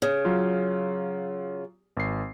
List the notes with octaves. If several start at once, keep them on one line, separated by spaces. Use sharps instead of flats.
C#3
F#3 F4
G#1 C7